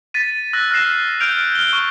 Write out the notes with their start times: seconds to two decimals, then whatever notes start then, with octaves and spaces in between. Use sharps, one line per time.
0.14 A6 B6 D#7
0.53 E6 F#6 A#6
0.71 F6 F#6 A#6 C7 E7
1.20 F6 G6 D7 F7
1.55 F6 G7
1.73 C#6